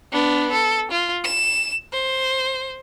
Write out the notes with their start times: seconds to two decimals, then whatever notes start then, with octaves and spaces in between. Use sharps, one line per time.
0.12 B3 D4
0.52 A4
0.91 F4
1.24 E7
1.93 C5